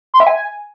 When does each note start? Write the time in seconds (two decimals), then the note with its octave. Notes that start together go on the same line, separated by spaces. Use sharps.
0.14 C6
0.20 E5
0.27 G#5